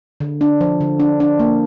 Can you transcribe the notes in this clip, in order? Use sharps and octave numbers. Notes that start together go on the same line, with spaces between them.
D3
D4
F3
D3
D4
D4
A#3